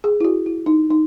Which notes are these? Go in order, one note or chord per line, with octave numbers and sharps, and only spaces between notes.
G#4
E4
F#4
E4
D#4
D#4